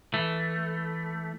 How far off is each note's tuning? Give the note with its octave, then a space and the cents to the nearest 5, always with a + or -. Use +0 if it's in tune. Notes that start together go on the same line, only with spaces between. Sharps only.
E3 +0 A3 +0